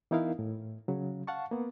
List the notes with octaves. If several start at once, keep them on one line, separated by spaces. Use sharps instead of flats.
E3 B3 D#4 E4 A#4 F5
A2
C#3 F#3
F5 F#5 A5 C#6
A#3 B3